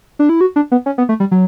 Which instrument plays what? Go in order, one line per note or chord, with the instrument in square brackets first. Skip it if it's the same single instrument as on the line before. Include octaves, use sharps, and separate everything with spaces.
[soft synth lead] D4
E4
F#4
D4
B3
C#4
B3
A3
G3
F#3